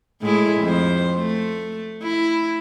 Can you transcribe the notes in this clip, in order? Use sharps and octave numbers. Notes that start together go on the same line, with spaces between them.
A2 G#3 E4
F2 C5
A3
E4